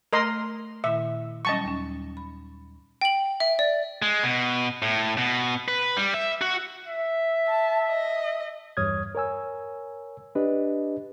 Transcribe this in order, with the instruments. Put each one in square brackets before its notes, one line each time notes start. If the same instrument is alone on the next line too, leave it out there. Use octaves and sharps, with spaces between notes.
[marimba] A3 [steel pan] A#4 D#5 C6
[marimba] A#2 D#3 E4 [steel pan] E5
[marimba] F#3 G3 C#4 [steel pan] D#5 A5 C#6
[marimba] D#2 C#4
B5
[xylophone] G5 F#7
E5
D5
[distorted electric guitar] G#3
B2
A2
B2
B4
G3
E5
F#4
[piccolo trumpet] E5
[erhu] A5
D#5
[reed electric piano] E2 G2 C#5 D#6 F6 G#6
A#4 C#5 G#5 E6
D4 G4 B4 D#5